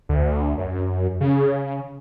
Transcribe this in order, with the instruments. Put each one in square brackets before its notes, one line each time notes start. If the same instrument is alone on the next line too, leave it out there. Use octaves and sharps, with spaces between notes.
[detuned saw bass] D2
F#2
C#3